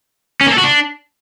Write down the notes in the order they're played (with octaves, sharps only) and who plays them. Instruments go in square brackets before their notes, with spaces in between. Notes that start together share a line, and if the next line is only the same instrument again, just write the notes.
[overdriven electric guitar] C#4
A#3
A4
F#4
D4